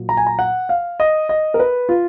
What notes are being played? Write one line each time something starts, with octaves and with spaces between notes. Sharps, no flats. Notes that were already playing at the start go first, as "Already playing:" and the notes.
Already playing: A#2 F#3
A#5
G#5
A#5
F#5
F5
D#5
D#5
A#4
B4
F4